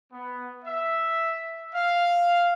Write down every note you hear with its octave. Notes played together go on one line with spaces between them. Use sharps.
B3
E5
F5